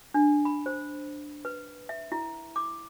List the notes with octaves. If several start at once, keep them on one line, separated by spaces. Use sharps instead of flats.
D4
B5
C5
B4
E5
E4
D6